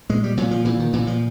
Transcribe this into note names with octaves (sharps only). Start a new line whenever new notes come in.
A#2 G#3
G3
A#2 F#3
F3
A#2 E3
D#3
A#2 E3
F3